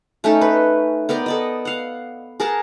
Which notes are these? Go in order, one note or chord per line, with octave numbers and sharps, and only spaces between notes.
A3 C#4 D#4 A4
B4
B3 A#4 D5 G5
A4 D5 D#5
F5 F#5
G#4 A#4 F#5 A5